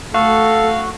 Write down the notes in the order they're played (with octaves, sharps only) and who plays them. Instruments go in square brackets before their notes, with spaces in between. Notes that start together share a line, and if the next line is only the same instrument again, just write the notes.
[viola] A3 [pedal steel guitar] F#4 [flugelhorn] A4 [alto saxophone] F5